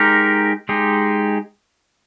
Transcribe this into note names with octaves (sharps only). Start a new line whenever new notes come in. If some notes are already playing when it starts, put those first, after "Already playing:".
Already playing: G#3 D#4 G4 A#4
G#3 D#4 G4